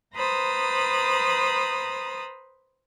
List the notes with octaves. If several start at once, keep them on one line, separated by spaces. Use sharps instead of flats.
B4 C5 A#5 B5 D#6 A6